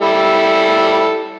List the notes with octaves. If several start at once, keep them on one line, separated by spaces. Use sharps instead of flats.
G3 E4 A4